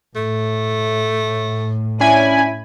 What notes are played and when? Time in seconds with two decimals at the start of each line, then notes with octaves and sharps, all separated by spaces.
0.16 A2 A3
2.00 C#4 D4 E4 G#5 B5